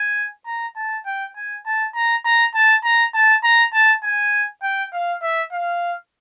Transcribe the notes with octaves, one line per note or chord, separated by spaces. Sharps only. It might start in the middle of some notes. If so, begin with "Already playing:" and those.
Already playing: G#5
A#5
A5
G5
G#5
A5
A#5
A#5
A5
A#5
A5
A#5
A5
G#5
G5
F5
E5
F5